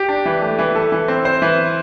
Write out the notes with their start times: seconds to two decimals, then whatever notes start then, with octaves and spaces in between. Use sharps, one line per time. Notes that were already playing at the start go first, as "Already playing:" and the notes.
Already playing: G4
0.09 D4
0.25 E3
0.42 A3
0.58 E3
0.76 A4
0.92 E3
1.08 C4
1.25 C5
1.42 E3